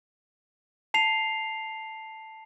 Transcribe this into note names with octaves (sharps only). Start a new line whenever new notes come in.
A5 C7 F7